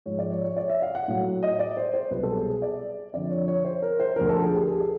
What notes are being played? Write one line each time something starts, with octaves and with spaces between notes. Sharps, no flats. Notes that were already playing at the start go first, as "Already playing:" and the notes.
G#2 F3 G#3 C#5
D5
C#5
C#5
D5
E5
F5
F#5
A2 F#3
D#5
D5
C5
C5
C2 B2 F#3 B4
A4
G#4
G#4
D5
F2 D3 F3 D5
C#5
C#5
C5
A#4
C5
D2 D3 F3 A#4
A4
G#4
G4
G#4
A4